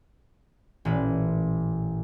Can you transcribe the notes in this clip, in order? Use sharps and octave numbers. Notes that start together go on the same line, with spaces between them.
A1 A#2 B4